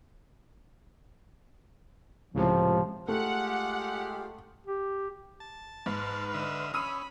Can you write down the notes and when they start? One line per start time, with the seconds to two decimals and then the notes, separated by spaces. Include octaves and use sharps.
2.34 C#2 A2 C3 F3
3.08 G#3 A3 F4 G4 F#5
4.67 G4
5.40 A5
5.86 G#2 B4 C6 F6
6.34 D3 D#5 E5
6.74 C#4 B5 D#6 E6 D#7